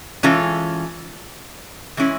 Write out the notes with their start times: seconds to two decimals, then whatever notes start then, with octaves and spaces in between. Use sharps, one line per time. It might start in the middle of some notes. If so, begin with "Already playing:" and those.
0.23 E3 G#3 C#4 F4 A4
1.97 E3 G#3 C#4 E4